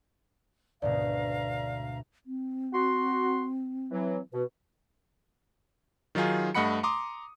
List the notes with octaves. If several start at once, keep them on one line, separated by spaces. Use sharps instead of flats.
D2 G#2 B2 D5 F5 A#5
C4
F#4 C6
E3 F#3
B2 B4
D#3 F#3 D#4 F4 G#4
G2 A3 D#5 F#5 B5 C#7
A#5 C6 D6 D#6